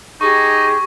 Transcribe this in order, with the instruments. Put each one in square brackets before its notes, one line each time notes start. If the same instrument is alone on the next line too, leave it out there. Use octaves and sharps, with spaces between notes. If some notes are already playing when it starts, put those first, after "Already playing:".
[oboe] D#4 [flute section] G4 G#4 [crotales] C#6